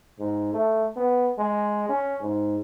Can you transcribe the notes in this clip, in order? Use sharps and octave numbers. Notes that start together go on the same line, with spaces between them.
G#2
A3
B3
G#3
C#4
G#2